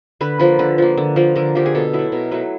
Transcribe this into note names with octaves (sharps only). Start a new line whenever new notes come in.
D3 B4
F3 A#3 B4
D3 B4
F3 A#3
D3
F3 A#3
D3 A#4
F3 A#3 G4
G#4
B2 A4
F#3 A3 E4
B2 A#4
F#3 A3 B4